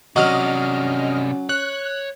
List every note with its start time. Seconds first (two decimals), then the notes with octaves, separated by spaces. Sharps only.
0.16 C3 F#3 C#4 D4 D#5 F6
1.49 C#5 F#6